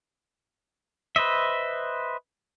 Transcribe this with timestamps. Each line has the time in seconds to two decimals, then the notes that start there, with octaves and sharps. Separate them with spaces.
1.16 B4 C5 D#5 E5